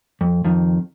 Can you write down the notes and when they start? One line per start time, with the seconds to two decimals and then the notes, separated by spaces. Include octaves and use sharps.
0.21 F2
0.45 F2 D#3